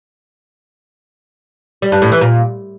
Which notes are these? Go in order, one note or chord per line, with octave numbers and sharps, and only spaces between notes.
G3
G2
A2
E3
A#2